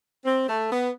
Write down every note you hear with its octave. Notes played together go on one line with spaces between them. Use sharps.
C4
A3
B3